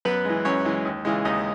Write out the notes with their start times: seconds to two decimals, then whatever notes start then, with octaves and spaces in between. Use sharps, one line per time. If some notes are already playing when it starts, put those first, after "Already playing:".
0.05 F#2 B3 B4
0.25 E3 G#3
0.45 F#2 C#4 C#5
0.65 E3 G#3
0.85 D#2
1.05 C#3 E3 G#3
1.25 D#2 D#4 D#5